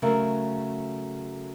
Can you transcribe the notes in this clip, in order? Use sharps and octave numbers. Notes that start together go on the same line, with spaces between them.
C#3 F#3 A3 A#4